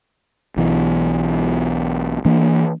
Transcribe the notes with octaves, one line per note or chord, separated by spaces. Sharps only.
B1 B2 E3
E3 A#3 D4